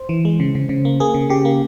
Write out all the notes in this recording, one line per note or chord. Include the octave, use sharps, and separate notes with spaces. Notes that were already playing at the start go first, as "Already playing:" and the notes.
Already playing: C5
E3
G#3
C#3
C#3
C#3
A#3
A#3 G#4
C#3
C#3 G4
A#3